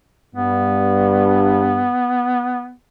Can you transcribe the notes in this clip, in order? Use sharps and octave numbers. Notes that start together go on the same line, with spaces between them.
G2 B3